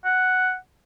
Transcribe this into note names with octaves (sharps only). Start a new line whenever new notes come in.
F#5